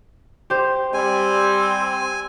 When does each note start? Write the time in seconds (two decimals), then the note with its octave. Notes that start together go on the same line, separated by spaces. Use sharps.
0.50 G4 C5
0.94 G3 C4 G#5